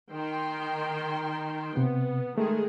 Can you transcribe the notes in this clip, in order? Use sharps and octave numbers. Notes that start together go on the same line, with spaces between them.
D#3 G5 C6
C3 B3
D#3 G#3 A3 G#4